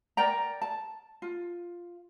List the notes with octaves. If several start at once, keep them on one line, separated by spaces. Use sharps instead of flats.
A#4 D5 G5 A#5
A5
F4